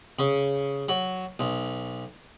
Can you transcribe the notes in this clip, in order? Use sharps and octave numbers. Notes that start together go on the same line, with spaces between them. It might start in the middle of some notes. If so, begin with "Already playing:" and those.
C#3
F#3
B1